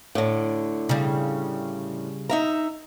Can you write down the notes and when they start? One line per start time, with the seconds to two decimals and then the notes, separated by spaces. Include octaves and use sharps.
0.15 A2 D3
0.89 C#3 G3
2.29 D#4 E5 A#5